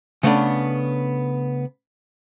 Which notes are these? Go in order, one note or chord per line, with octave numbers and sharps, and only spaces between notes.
C#3 A3 B3 C#4 D4